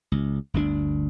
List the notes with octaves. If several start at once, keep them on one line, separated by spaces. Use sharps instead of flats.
C#2
G1 D2 D3 D4